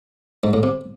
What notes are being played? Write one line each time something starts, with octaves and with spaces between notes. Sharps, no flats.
G#2
A2
C3